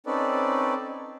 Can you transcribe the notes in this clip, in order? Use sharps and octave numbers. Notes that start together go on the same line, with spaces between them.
C4 C#4 D#4 A4 B4 D5